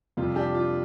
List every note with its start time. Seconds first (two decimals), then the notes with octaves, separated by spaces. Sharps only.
0.17 F2 C3 G3 F4
0.35 D4 G4
0.55 F4